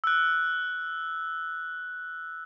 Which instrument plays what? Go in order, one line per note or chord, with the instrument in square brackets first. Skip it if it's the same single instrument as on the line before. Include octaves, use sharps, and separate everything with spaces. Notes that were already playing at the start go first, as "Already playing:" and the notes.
[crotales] E6 F#6